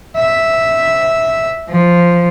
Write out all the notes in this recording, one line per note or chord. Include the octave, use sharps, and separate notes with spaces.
E5
F3